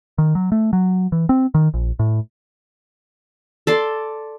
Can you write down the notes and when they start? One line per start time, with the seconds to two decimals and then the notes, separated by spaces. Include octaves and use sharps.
0.18 D#3
0.35 F#3
0.52 A3
0.73 F#3
1.12 E3
1.29 C4
1.54 D#3
1.74 A#1
1.99 A2
3.67 A4 D5 C6